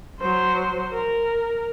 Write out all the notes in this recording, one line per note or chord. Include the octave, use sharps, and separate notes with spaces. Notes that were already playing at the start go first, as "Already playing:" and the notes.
F#3 C5
A#4